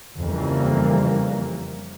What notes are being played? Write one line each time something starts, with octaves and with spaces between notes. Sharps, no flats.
F2 C#3 E3 G3 A#3